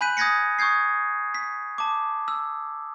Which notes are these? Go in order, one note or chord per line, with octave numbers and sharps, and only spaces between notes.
G#5 B5 F#6 G6 B6 D#7
D#6 G6 G#6 A#6 B6 C#7
C#6 D#6 G6 G#6 C7
B6
A5 D6
E6